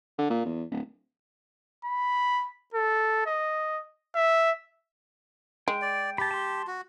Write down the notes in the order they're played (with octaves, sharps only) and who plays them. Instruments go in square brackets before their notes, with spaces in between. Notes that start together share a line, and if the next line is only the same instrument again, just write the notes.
[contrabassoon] D3
A#2
E2
D1
[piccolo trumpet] B5
A4
D#5
E5
[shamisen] G#3 [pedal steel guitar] G5
[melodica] D5
[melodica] G4 [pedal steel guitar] A5 B5
[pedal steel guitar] A5 C6
[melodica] F#4